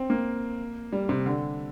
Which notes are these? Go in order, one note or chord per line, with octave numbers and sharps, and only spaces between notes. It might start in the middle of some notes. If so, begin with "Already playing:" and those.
Already playing: C4
A#3
G3
C3
D3